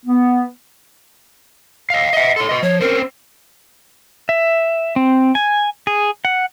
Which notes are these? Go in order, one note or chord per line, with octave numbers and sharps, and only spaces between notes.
B3
D#5 F5
D#5 E5 F#5
A4 C#5 C6
B4 D#5
F3 C#5
C4 C#4 A#4 C5
E5
C4
G#5
G#4
F#5